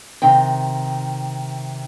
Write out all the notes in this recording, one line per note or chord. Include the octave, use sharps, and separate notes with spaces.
C3 D#3 G5